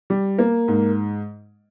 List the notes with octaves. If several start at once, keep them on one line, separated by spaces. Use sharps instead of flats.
G3
A#3
G#2